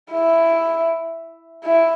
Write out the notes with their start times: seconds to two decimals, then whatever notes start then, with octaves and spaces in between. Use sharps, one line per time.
0.12 E4
1.65 E4